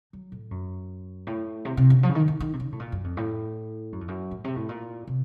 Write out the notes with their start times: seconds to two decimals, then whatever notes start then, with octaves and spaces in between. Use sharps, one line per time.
0.13 F#3
0.32 A2
0.51 F#2
1.27 A2
1.65 C3
1.77 C3
1.90 C#3
2.03 F3
2.09 C#3
2.15 D#3
2.28 D#3
2.40 D#3
2.53 C3
2.60 C#3
2.72 A2
2.80 A#2
2.92 F#2
3.04 F2
3.17 A2
3.93 F#2
4.01 F2
4.08 F#2
4.31 A2
4.44 C3
4.56 A2
4.69 A#2
5.07 C3